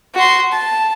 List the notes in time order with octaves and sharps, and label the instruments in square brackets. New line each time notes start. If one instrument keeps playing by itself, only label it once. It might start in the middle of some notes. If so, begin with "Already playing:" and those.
[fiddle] F#4 C6
A5